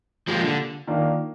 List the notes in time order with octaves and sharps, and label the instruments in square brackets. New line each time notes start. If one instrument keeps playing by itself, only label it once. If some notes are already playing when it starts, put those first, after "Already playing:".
[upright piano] A#2 G3 A#3 [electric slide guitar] F3 G#3
[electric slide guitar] D3
[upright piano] D#3 A#3 D4 F4